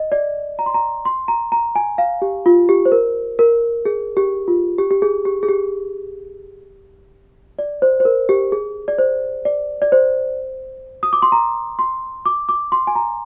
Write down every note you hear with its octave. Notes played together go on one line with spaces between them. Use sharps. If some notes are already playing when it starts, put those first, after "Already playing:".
Already playing: D#5
D5
A#5
C6
A#5
C6
A#5
A#5
G#5
F5
G4
F4
G4
C5
A#4
A#4
G#4
G4
F4
G4
G4
G#4
G4
G#4
G4
D5
C5
C5
A#4
G4
G#4
D5
C5
D5
D5
C5
D#6
D6
C6
A#5
C6
D6
D6
C6
G#5
A#5